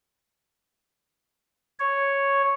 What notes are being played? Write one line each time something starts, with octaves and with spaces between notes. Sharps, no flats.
C#5